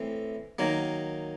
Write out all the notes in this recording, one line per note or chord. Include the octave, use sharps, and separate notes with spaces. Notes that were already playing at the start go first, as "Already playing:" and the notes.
Already playing: A2 E3 C4
D#3 F#3 A#3